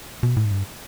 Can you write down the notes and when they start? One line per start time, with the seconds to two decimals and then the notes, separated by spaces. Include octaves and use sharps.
0.23 B2
0.37 A2
0.45 G#2
0.51 G2